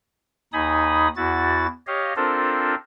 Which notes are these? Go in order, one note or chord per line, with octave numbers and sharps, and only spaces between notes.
D#2 D#4 G#5 B5 D#6
E2 E4 F#4 A6
G4 C#5 D#5 F5
C4 D4 F4 A4 A#4 C5